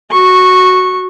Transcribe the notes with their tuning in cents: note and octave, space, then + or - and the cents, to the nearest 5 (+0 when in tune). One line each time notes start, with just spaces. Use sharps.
F#4 +0 C#6 -10